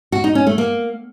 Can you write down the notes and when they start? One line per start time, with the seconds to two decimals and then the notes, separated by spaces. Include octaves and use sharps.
0.12 F#4
0.24 D#4
0.35 C#4
0.47 A3
0.58 A#3